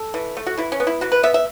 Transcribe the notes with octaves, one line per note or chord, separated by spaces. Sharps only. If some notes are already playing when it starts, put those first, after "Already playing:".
Already playing: A4
E3
A3
F#4
E3 E4
C#4
B3
E4
E3 F#4
B4
B3 E5
E5